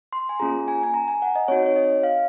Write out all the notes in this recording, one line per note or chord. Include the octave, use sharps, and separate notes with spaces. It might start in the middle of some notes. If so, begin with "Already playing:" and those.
C6
G#5
A#3 C#4 F4 G#4 A#5
G#5
G#5
A#5
G#5
F#5
D#5
C4 D#4 F#4 C#5
C#5
D#5
F5